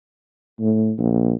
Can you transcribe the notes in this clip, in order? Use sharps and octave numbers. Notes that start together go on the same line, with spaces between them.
A2
A#1